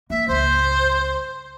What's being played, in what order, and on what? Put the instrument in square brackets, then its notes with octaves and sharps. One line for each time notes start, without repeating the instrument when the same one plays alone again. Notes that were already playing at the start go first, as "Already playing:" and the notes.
[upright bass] A#3 [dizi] E5
[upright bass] C#2 G2 [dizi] C5